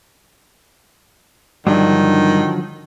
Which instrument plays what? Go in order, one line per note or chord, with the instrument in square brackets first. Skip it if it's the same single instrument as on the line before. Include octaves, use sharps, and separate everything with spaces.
[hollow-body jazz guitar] G2 [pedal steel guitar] D3 F3 F#3 [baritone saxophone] D#3